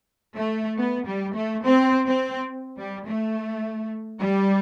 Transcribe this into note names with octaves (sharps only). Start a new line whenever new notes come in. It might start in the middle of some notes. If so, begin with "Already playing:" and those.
A3
B3
G3
A3
C4
C4
G3
A3
G3